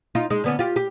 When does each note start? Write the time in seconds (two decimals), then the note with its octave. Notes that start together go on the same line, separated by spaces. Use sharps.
0.15 D#4 F4
0.30 G#3 D#4
0.44 D3 B3 C#4
0.59 F4 G4
0.76 G4